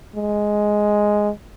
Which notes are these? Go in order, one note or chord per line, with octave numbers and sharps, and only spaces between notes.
G#3